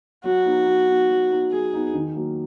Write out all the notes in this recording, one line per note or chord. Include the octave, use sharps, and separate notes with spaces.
F#3 F#4
B3 D#4
F#3
B3 D#4
F#3
B3 D#4
F#3 G#4
B3 D#4
D#3
F#3 A#3